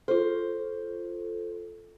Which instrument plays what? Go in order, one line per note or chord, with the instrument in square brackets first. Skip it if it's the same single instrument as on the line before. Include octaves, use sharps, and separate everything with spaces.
[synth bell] F4 A4 [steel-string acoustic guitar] C5